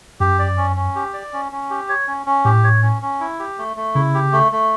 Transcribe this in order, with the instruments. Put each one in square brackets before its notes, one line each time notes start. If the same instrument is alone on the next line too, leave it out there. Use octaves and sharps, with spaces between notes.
[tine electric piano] F#2 [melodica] G4
[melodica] D5
C#4
C#4
G4
D5
C#4
C#4
G4
C#5
C#4
C#4
[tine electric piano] A2 [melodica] G4
[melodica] C#5
C#4
C#4
E4
G4
A3
A3
[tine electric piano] C#3 [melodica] E4
[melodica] G4
A3
A3